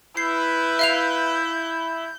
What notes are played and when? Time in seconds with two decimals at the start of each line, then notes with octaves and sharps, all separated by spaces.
0.17 E4 B4 G6 C7
0.79 E5 F5 F7